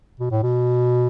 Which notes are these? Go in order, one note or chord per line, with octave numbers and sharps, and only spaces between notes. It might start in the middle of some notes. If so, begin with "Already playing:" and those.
B2
A2
B2